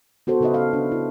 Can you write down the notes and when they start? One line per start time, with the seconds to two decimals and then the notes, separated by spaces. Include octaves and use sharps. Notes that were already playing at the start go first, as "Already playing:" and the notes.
0.27 B3 F#4 A4 C5
0.41 C#3 D#4 B4 C5 D#5 E5
0.54 F#4 A4 F5
0.73 D4
0.92 E4